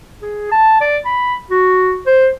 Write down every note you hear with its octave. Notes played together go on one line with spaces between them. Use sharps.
G#4
A5
D5
B5
F#4
C5